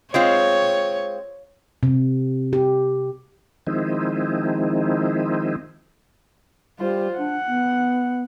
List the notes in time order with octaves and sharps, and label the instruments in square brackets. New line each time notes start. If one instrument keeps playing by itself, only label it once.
[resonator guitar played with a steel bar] G#3 C4 F4 [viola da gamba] C#5
[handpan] C3
G4
[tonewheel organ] D#3 F3 G#3 C4 D#4 E4
[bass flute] G3 [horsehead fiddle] F4 C5
[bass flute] D4 [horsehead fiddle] F#5
[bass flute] B3